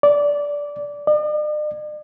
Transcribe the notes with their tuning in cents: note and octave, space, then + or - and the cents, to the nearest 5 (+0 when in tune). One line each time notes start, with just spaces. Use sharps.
D5 -15
D5 +45